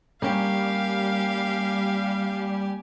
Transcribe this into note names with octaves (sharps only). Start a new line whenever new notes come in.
G3 A#3 C#4 G4 F5 G#5